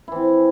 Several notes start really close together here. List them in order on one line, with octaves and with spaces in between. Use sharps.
E4 E3 C4